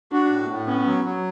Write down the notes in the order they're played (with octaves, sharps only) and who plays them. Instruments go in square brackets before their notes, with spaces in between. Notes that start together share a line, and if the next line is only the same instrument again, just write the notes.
[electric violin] D4 [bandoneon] F#4
[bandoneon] A2
A2
[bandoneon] B3 [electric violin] C#4
[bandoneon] F#3
F#3